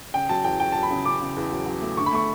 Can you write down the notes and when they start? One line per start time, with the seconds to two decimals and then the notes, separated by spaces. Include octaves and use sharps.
0.14 C#3 G5
0.29 F#3 A5
0.44 E2 G5
0.60 F#3 G5
0.72 F#3 A5
0.83 B5
0.90 C#3
1.05 C#3 D6
1.21 C#3
1.36 E2
1.52 F#3
1.66 F#3
1.82 A3
1.97 D3 C#6
2.06 B5
2.13 A3 C#6